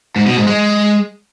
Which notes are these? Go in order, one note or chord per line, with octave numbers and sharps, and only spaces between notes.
G#2
B2
G#2
G#3